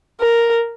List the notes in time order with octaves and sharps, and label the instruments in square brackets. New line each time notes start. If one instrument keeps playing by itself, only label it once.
[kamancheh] A#4